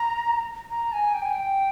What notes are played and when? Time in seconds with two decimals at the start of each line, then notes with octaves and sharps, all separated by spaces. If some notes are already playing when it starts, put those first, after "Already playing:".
Already playing: A#5
0.70 A#5
0.92 G#5
1.14 G5
1.22 G#5
1.30 G5